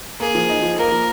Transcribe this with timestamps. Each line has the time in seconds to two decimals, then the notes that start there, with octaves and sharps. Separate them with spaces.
0.20 A#3 G#4
0.35 F3
0.49 D#4
0.63 F3
0.78 A#3 A#4
0.92 F3